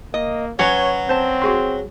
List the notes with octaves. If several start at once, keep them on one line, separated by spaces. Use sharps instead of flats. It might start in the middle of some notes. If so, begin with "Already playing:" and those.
A#3 D#5
F#3 C#4 B4 C#5
C4 C5 A5
F#4 G#4 C6